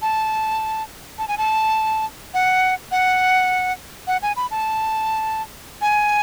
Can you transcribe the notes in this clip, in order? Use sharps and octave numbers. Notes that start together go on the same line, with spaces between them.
A5
A5
G#5
A5
F#5
F#5
F#5
G#5
B5
A5
G#5